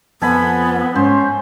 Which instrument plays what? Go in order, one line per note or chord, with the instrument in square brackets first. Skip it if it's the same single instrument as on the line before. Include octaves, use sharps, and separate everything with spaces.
[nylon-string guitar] F2 F3 [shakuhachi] B3 [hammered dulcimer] A4 G#5 B5
[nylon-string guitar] G#2 [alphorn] C#4 [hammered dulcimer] C5